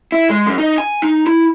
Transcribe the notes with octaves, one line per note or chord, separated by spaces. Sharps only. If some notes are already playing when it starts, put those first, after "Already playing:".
E4
G#3
F#2
D#4
G#5
D#4
E4